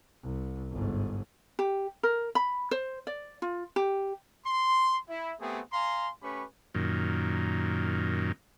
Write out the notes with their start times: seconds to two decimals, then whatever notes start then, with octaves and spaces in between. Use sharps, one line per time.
0.22 C2
0.71 G1 G#2
1.59 G4
2.03 A#4
2.35 B5
2.71 C5
3.07 D5
3.42 F4
3.76 G4
4.45 C6
5.09 E4
5.40 A3 B3 C4 G4 G#4
5.72 F5 G#5 A#5 C6
6.22 A3 C#4 G4 B4 B5 C#6
6.74 F#2 A#2 D#3